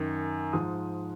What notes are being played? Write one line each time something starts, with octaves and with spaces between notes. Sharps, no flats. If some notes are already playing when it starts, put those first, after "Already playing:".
Already playing: F#2 D#3
G#2 F3 D#6